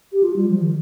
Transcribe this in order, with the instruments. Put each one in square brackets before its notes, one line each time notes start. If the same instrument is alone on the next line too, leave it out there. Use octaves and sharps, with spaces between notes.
[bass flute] G4
F4
G3
F3
D#3